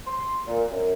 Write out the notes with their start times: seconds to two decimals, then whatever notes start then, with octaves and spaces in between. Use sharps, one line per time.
0.06 C6
0.47 A#2
0.71 F#2